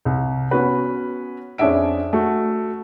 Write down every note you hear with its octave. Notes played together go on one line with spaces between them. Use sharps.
C2
B3 C#4 F#4 B4
F2 C#4 D4 G#4 E5 D7
A3 F#4